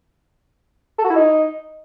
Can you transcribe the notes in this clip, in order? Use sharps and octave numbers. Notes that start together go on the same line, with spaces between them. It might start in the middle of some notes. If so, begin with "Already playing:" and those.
A4
F#4
E4
D#4